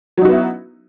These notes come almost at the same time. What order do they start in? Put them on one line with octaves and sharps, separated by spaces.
F#3 D#4 F#4 B3 E4